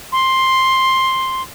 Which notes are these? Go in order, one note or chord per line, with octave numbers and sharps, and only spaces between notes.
C6